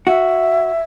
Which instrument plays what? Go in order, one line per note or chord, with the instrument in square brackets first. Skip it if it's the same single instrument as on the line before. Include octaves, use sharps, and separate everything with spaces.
[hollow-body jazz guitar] F#4 [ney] E5